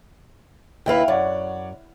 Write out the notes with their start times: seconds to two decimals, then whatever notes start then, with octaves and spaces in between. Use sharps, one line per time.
0.86 D#2 E4 B4 F5 G5
1.08 F#2 C#5 D5 F#5